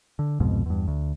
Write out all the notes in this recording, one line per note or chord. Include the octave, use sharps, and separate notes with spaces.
D3
C2 F2 G#2 B2
E2 G2
D2